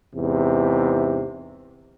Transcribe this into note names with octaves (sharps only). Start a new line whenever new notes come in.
E2 G#2 C3